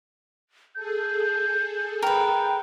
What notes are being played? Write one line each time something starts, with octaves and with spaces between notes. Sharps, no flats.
G#4 A4 G6
A#4 B4 G5